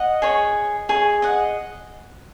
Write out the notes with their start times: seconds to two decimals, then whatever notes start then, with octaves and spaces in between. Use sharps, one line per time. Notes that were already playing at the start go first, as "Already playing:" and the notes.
Already playing: D#5 F#5
0.22 G#4 C#5
0.89 G#4 C#5
1.22 D#5 F#5